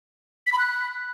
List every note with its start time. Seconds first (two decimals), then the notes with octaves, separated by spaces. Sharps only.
0.47 B6
0.53 B5
0.58 F#6